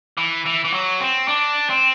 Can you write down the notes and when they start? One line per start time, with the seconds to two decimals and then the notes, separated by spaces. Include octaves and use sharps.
0.18 E3
0.46 E3
0.65 E3
0.73 F#3
1.00 C4
1.28 D4
1.70 C4